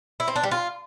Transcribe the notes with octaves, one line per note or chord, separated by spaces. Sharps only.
E4
C4
D4
G3
F4